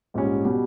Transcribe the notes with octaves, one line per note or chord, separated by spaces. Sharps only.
A#1 G#2 G3 C#4
B2 G3